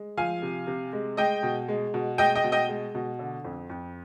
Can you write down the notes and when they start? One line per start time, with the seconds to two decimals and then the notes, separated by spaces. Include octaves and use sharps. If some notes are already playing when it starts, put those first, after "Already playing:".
Already playing: G#3
0.17 F3 F5 G#5
0.42 C3
0.67 C3
0.93 G#3
1.17 G#3 D#5 G5
1.43 B2
1.68 G#3
1.94 B2
2.18 G#3 D#5 G5
2.35 D#5 G5
2.44 B2
2.52 D#5 G5
2.69 G#3
2.95 B2
3.19 D3
3.44 F2
3.70 F2